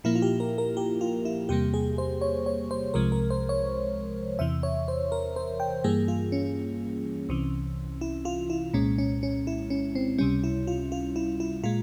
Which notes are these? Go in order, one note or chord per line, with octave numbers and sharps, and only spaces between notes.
A#2 F3 A#3 E4
F4
G4
A#4
A#4
G4
F4
E4
E2 C3 G3 A#3 G4
G#4
C5
C#5
C#5
C5
C2 C3 F3 G#3 A#4
A#4
C5
C#5
E2 C3 E3 E5
C#5
C5
A#4
C5
G5
G2 E3 G3 A#3 G#4
F4
C#4
C2 C3 E3
E4
F4
E4
C2 A#2 G#3 C#4
C#4
C#4
E4
C#4
C4
C#2 C3 G3 C#4
E4
F4
F4
E4
E4
A#2 G#3 F4